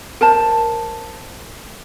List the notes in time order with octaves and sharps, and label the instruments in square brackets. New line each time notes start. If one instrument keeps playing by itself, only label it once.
[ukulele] A#4 C5 A5